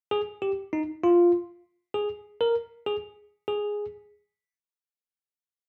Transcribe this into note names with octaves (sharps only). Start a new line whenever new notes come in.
G#4
G4
D#4
F4
G#4
A#4
G#4
G#4